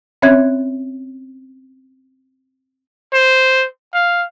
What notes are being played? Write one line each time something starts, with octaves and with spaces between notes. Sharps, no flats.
C4 C#4 C#5 E5 F#6 G#6
C5
F5